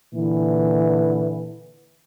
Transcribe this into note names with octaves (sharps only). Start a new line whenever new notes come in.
A#2 D3 E3